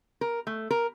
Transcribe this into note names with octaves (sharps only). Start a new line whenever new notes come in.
A#4
A3
A#4